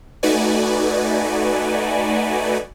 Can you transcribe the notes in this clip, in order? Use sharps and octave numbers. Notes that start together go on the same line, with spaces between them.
A3 D#4 F#4 B4 D5 G#5